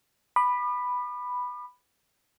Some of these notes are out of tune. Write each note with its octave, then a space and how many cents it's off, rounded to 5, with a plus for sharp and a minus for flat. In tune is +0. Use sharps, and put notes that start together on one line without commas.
B5 +0 D6 +45